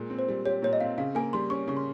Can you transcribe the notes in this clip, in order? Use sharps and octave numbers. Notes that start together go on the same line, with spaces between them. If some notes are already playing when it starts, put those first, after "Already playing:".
Already playing: A#2 G#3
C4
C5
G3
G4 C#5
A#2 C#5
D#5
C4 F5
C#3 F5
A#3 G#5
G3 C6
C#4 C#6
C#3 C#6
C6